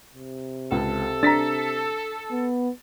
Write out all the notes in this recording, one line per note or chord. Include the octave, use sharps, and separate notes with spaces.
C3
C#2 A4
D4 A#5 A6 B6
B3